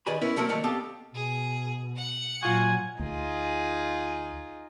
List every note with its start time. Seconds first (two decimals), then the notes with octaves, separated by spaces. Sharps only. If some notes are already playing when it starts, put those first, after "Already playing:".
0.06 D#3 G#4 B4 D5 G#5 B5
0.21 B3 C#4 E4 A#4 B4
0.36 F#3 A3 A#3 C4 A#4
0.49 D#3 F#3 A3 A#3 D4
0.64 B3 C4 G4 A4 F5 A5
1.14 B2 G#4
1.96 F#5 C#7
2.43 A#2 F#3 F4 F#4 G#5
3.00 D2 D#4 F4 G#4